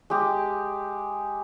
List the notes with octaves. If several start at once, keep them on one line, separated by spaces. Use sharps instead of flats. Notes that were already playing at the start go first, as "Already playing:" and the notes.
G#3 G4